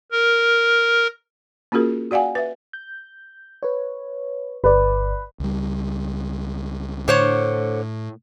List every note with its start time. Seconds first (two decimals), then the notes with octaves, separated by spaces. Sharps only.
0.12 A#4
1.72 A#3 C#4 F4 F#4 G#4 A#4
2.11 F#4 D5 F5 F#5 G#5
2.35 B4 E5
2.73 G6
3.63 B4 C#5
4.64 G1 B4 D5
5.40 C#2 G3
7.08 A2 D3 C5 C#5